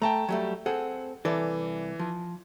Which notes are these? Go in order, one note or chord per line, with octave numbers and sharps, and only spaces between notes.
A3 G5 A5 A#5
F#3 G3 A3
C4 G#4 A4 F#5
C2 E3 A4 D5
F3